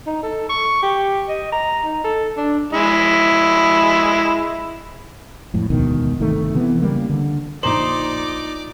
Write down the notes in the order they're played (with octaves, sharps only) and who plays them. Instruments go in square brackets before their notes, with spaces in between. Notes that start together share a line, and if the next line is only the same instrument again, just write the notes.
[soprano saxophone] D#4
A4
C#6
G4
D#5
A#5
D#4
A4
D4
[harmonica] G#3 E4
[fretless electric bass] F2 A2
E1 D2 B2 D#3
G1 C3 D#3 A3
C3 E3 B3
C#3 G3 A#3
D3
[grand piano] A#1 A#5 F#7 [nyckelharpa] D#4 [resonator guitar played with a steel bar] C5 [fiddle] D5 D6